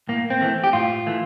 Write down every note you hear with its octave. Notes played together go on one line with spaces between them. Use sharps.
A2 A#3
C4
E3 A3
G4
A2 F4
E3 A3